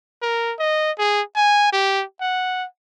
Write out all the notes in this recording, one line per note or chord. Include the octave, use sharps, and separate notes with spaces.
A#4
D#5
G#4
G#5
G4
F#5